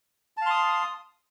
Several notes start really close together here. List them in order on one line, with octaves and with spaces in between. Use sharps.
A5 F5 C6 D#6